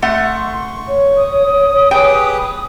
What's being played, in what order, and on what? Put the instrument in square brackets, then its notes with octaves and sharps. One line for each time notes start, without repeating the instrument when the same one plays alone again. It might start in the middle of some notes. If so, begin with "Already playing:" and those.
[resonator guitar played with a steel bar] A3 F#5 [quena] C6 [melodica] C#6
[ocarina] C#5
[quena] D#6
[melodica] G4 G#4 B4 [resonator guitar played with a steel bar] G5